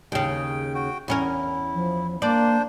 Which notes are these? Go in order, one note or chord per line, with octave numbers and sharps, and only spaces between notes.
D#2 C#3 G5
F#4 G5
E2 C#4 E4 A#4
F3
A#3 D4 C5 D5